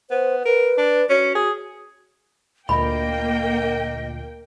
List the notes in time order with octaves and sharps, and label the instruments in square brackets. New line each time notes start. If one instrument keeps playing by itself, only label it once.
[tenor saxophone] B3 [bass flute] C5
[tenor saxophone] A#4 [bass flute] B4
[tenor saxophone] D4
[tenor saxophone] C#4 [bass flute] F#4
[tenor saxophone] G#4
[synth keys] D2 A#2 [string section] A#3 G5 [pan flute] D#5 [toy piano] B5